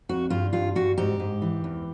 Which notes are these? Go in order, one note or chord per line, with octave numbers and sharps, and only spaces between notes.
F2 F#4
G2 F4
G2 F4
G2 F#4
G#2 G4
G#2
E3
E2